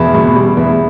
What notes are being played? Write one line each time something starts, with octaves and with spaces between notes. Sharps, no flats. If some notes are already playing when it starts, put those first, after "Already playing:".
Already playing: E2 B2
B2
G3
E2